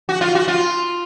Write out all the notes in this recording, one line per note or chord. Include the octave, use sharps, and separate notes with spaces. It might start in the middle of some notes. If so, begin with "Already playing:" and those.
F#4
F4
F#4
F4